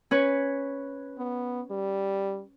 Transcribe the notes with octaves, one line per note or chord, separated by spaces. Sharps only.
C#4 B4 C#5
B3
G3